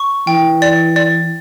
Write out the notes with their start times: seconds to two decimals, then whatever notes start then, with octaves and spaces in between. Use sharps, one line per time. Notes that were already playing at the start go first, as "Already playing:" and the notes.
Already playing: C#6
0.27 E3 G5
0.62 D5
0.96 D5